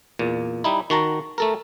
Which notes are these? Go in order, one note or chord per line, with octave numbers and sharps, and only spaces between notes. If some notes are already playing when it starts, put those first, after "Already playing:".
E2 A#2
G3 D#4 E4
D#3 F#4 A5 A#5
A3 A4 A#4